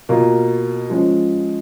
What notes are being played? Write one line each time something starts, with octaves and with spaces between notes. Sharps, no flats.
B2 A#3 F4
F3 G#3 C#4